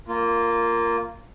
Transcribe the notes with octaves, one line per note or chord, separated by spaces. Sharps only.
A#3 F4